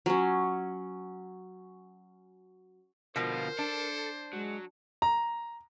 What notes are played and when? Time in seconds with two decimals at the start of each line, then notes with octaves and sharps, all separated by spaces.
0.06 F#3 C#4
3.16 B2 D3 F3 F4 A#4 C5
3.59 D4 A4
4.33 F#3 G#3
5.02 A#5